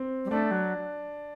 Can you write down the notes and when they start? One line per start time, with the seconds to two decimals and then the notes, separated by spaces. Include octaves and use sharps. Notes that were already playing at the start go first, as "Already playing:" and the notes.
Already playing: C4
0.25 G3
0.30 A3 D4
0.51 F#3